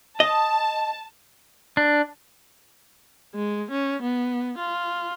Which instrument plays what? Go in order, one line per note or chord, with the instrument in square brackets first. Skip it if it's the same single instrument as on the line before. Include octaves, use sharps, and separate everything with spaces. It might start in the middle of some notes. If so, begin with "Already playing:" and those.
[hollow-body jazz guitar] D#5 [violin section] A5
[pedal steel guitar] D4
[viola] G#3
C#4
B3
F4